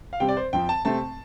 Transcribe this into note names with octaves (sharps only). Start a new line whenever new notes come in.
F5
C3 G3 C4 G5
D5
C5
F2 F3 C4 G5
A5
C3 A3 C4 A5